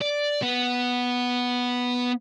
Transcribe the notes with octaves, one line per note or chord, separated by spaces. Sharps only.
D5
B3